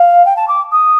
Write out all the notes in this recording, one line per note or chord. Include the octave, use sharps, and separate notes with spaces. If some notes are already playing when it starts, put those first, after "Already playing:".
Already playing: F5
G5
A5
D6
D#6